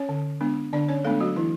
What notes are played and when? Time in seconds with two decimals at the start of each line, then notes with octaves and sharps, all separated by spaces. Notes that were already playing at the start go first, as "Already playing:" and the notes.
Already playing: C#4 C#5
0.09 D3
0.41 G#3 B3 D4
0.73 D3 D4 D5
0.89 C#4 C#5
1.05 G#3 A3 B3 D4 A4
1.20 F#3 F#4
1.36 E3 E4